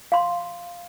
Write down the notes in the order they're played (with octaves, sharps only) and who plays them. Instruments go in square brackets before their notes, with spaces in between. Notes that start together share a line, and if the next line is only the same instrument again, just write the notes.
[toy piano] F5 C6